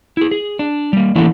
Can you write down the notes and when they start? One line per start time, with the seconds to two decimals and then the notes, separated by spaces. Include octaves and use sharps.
0.17 E4 G#4
0.31 G#4
0.59 D4
0.93 G3 A#3
1.16 E3 A3 A#3 C#4 D4 E4